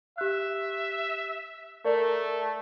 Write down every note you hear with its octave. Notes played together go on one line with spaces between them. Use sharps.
G4 E5 F#6
A3 A#4 D5